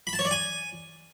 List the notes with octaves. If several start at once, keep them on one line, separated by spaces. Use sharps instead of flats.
B5
A5
C#5
D5
G#5